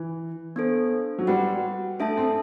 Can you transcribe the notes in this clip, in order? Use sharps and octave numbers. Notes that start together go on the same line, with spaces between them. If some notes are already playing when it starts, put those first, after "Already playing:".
Already playing: E3
B3 D4 A4 C5
F#3
G3 F#4 B4 F#5
A3 D4 A4 E5 A5
C4